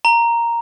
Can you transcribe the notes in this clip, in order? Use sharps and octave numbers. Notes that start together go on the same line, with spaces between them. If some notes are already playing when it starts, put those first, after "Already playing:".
A#5